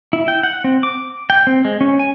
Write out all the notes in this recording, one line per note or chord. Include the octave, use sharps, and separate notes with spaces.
E4
G5
F#5
C4
D6
G5
C4
G#3
C#4
G#5